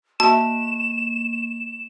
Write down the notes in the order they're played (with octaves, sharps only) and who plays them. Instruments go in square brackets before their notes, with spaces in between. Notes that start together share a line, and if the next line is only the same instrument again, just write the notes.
[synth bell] A#3 [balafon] F#4 E5 [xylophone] A5 [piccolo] E7